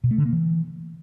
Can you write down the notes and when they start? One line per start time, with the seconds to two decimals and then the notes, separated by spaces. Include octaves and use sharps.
0.04 B2
0.11 A3
0.18 D3
0.25 A#3
0.33 E3